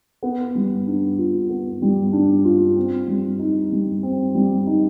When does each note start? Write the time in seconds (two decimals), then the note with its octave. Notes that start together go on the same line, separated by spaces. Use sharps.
0.23 B3
0.55 G3
0.87 D4
1.18 F4
1.49 B3
1.82 G3
2.13 D4
2.45 F4
2.76 C4
3.08 G3
3.39 D#4
3.72 G3
4.03 C4
4.35 G3
4.67 D#4